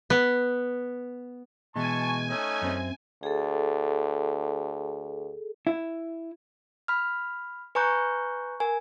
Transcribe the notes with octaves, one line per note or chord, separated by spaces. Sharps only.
B3
B2 E3 G#3 G#5 A5 C#6
A3 C#4 D#4
F#2 C4
D2 G#4 A4
E4
B5 F6
B4 G#5 A#5 C#6 F#6 G6
A#4 G#5